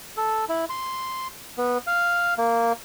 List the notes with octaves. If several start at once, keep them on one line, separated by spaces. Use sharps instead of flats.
A4
E4
C6
B3
F5
A#3